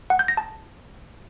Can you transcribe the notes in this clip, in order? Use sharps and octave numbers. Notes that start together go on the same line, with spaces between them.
F#5
G6
A#6
A5